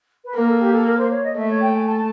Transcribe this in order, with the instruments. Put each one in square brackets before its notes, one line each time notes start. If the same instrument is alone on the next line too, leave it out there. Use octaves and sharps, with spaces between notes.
[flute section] B4
[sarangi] A#3 [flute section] A#4
[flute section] A4
G4
A4
A#4
C5
C#5
D#5
[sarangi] A3 [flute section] E5
[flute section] C#5
G5
G#5
A5